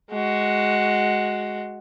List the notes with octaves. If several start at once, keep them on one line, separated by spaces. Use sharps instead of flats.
G#3 F#4